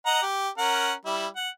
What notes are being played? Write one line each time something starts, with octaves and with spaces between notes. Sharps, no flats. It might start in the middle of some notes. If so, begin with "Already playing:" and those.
D#5 F#5 A#5
G4
C#4 A#4 F#5
G3 E4
F#5